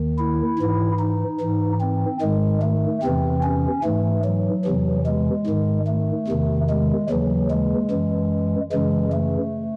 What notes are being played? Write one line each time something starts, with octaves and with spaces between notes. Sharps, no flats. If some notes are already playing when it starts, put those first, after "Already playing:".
Already playing: D#2 D#3
E4
G#2 E3
D#4
G#2 E3
C4
G#2 D#3 G#3
A3
E2 C3 E3 C4
C#4
G#2 E3 A3
F#3
E2 C3 E3
G#3
G#2 D#3
A3
E2 C3 D#3
G#3
D#2 C#3 E3 F#3
G#3
F#2 E3
F#2 C#3 E3 G#3
A3